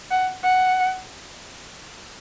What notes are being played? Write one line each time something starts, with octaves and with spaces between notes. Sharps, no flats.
F#5
F#5